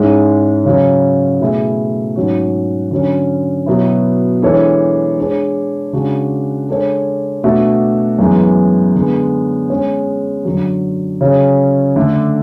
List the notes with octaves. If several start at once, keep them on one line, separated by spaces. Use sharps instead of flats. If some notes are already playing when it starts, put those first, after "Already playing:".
Already playing: G#2 G#3 C#4 E4 G#4
C#3 F#3 C#4
B2 A3 E4 G#4
G#2 F#3 C#4 F#4
D3 F#3 C#4
B2 F#3 B3 E4
E3 G#3 D4 A4 C#5
G#3 D4 G#4 C#5
C#3 G#3 D4 F#4
G#3 D4 A4 C#5
B2 A3 D4 F#4
F#2 E3 G#3 B3
D3 G#3 B3
G#3 C#4 G#4 C#5
F#2 D3 F#3
C#3 F#3 C#4 G#4
D3 A3 D4